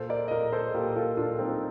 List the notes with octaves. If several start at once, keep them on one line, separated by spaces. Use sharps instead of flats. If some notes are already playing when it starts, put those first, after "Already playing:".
Already playing: A#2 A4 C5
A#4 D5
D#5
A#2 A#4 D5
A4 C5
A#2 G4 A#4
F4 A4
A#2 D4 F4
C4 D#4